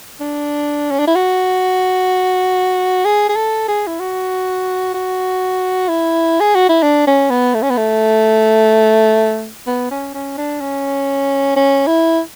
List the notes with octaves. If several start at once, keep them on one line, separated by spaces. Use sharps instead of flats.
D4
C#4
D4
E4
F#4
G#4
G#4
A4
G#4
E4
F#4
F#4
E4
G#4
F#4
E4
D4
C#4
B3
A3
C#4
B3
A3
B3
C#4
C#4
D4
C#4
C#4
E4